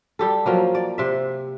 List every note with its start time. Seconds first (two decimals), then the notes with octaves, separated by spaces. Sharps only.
0.19 G3 G4 A4
0.46 F3 F#3 A#3
0.75 D5
0.98 C3 E5